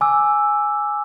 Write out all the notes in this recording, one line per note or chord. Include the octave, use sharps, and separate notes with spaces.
G#5 D6 E6